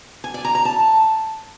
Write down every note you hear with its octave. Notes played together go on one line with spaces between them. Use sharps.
G#5
D5
A#5
A#5
A5